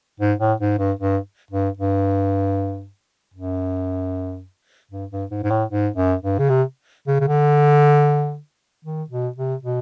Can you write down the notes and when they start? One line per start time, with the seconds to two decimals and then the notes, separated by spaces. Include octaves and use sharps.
0.20 G#2
0.40 A2
0.60 G#2
0.79 G2
0.99 G2
1.51 G2
1.77 G2
3.34 F#2
4.91 G2
5.11 G2
5.31 G#2
5.43 G#2
5.50 A2
5.70 G#2
5.96 F#2
6.23 G2
6.39 C#3
6.49 C3
7.07 C#3
7.20 C#3
7.27 D3
8.85 D#3
9.10 B2
9.36 C3
9.63 B2